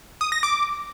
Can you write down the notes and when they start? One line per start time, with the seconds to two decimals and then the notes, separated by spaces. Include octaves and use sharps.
0.21 D#6
0.32 A#6
0.43 D6